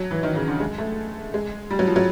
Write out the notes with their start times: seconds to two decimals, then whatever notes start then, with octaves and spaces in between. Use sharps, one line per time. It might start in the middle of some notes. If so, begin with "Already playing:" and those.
Already playing: F#3
0.11 E3
0.23 D#3
0.35 C#3
0.48 D3
0.60 G#3
0.78 A3
1.34 G#3
1.71 G3
1.79 F#3
1.87 F3
1.96 F#3